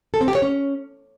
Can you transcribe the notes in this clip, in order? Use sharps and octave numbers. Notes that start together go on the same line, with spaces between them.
A4
C4
G4
C#5
C#4